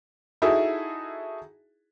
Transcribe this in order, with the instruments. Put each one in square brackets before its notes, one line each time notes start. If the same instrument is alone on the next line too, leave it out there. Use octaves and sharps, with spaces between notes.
[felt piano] D#4 E4 F#4 G#4 A4 E5